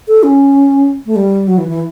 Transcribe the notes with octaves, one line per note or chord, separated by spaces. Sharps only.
A4
C#4
A3
G3
F#3
E3
E3